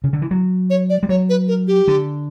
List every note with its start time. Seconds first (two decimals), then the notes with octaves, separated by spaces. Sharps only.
0.04 C#3
0.13 D3
0.22 E3
0.31 F#3
0.70 C#5
0.90 D5
1.03 G3
1.09 F#3 C#5
1.29 B4
1.48 A#4
1.67 G4
1.88 D3